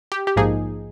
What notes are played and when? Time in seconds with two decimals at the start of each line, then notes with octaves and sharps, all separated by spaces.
0.12 G4
0.27 G4
0.36 A#1 G#2 F3 A#3 D#4 G#4